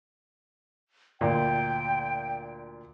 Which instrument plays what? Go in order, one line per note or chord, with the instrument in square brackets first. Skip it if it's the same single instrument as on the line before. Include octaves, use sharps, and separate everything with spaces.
[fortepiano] D2 A#2 [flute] G5